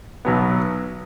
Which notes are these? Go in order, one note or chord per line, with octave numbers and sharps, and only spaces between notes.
B1 B2 F#3 B3